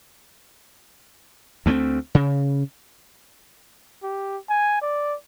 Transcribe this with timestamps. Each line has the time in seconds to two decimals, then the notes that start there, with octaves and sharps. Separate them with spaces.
1.66 D2 A3 A#3 C4
2.15 C#3
4.03 G4
4.49 G#5
4.82 D5